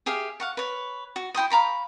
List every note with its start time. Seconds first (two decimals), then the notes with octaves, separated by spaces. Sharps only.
0.06 G4 G#4 E5 F5
0.40 F5 F#5 C#6
0.57 B4 C#5
1.16 F#4
1.34 E4 G5 C6 D#6
1.50 F5 A#5 B5 C#6